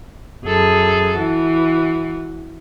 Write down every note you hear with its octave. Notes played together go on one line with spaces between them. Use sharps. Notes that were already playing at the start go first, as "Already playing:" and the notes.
F#2 G#4 A4
E3 F#4